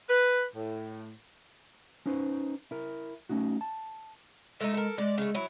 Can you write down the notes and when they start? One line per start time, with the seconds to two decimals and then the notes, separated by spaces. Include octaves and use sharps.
0.09 B4
0.55 A2
2.06 C#4 D#4 B4 C5
2.71 E4 A#4
3.29 A3 C#4 D#4 F#4
3.61 A5
4.61 G#3 A3 D#4
4.74 A4 A#4
4.98 G#3 D5
5.18 C#3 A3
5.35 F#3 E4